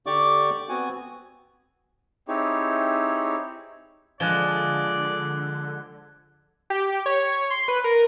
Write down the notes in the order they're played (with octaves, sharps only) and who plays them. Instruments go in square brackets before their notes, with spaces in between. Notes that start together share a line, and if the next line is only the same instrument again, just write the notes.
[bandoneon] D3 G4 D5 C#6 D6
B3 C4 F#4 G#5
[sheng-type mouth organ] C4 D#4 E4 G4 G#4 C#5
[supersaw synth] D3 [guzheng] F3 G#3 [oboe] D5 [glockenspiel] F#6 G#6 G7
[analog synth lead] G4
C#5
C6
B4
A#4